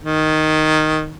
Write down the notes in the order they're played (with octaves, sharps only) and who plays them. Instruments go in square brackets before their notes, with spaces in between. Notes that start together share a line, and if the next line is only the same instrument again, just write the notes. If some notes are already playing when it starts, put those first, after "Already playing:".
[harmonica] D#3